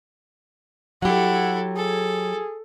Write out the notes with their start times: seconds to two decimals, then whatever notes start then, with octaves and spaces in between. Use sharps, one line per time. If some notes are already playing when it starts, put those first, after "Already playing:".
1.02 F#3 E4 G4 A4 F#5
1.76 G#4 A4